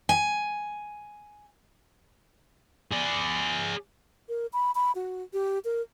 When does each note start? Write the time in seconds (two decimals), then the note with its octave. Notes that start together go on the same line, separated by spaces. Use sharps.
0.09 G#5
2.92 G#4 D5
4.29 A#4
4.53 B5
4.75 B5
4.95 F#4
5.33 G4
5.65 A#4